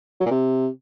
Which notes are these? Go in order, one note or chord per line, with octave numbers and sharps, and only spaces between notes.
F#3
A#2
C3